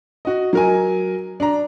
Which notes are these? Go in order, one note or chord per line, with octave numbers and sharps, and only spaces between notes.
F#4 D#5
F#3 A#4 G#5
D4 A#5